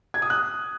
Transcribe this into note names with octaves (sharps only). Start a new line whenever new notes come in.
G#6
D#6
F#6